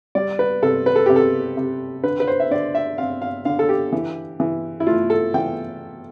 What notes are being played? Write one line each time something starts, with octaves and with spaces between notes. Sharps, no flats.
G3 D5
B4
C3 A4
B4
A4
C3 G4
A4
C3
D3 B4
B4
C5
E5
D3 D5
E5
C4 F5
F5
D3 F5
A4
G4
E3
E3
E4
A3 F4
A4
E3 G5